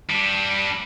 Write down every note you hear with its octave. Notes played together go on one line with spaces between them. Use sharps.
G3 D4